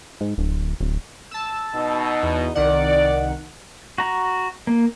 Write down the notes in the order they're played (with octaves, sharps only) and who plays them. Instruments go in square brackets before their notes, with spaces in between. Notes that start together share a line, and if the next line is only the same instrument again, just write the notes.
[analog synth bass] G#2
D1
D1
[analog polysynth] A5 E6
[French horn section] B2 D#4
[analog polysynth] E2
[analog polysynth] C2 D#3 F#5 [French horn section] D5
[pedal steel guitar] F#4 A#5
A#3